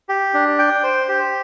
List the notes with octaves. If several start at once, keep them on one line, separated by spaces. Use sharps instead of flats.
G4
D4
G5
C5
G4